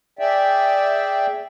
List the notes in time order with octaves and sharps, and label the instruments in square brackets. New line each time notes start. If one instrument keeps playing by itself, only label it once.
[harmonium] G#4 D5 E5 G5